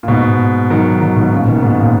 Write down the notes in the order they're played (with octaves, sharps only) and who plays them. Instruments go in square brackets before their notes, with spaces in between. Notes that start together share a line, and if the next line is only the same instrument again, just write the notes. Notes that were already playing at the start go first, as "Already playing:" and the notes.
[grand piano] A#2
G#2 B2
D#3 F#3
D#3 F#3
G#2 B2
A#2 C#3
B2 D#3
G#2 B2
A#2